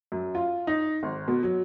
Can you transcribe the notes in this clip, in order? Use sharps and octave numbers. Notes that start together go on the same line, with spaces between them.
F#2
F4
D#4
G#1
B2
F#3